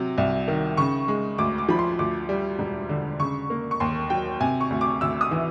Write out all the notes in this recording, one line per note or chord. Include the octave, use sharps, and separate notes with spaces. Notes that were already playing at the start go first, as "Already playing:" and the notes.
Already playing: C3 F#3
C2
D#3
C#3 C#6
G#3
D2 D6
D6
F3 B5
C6
D2 D6
G3
E1
D3
C#3 C#6
A#3
C#6
D#2 C6
F#3 G5
C3 G#5
C#6
D2
D6
D2 E6
D#6
E3